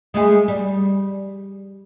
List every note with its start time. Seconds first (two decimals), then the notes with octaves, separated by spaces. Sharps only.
0.14 G#3 A3 G#4
0.48 G3